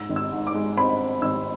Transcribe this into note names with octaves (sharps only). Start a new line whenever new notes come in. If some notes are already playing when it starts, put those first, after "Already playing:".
Already playing: G#2 E6
G#1
E6
G#2
D6
G#3
C4 B5
C4
G#1 E6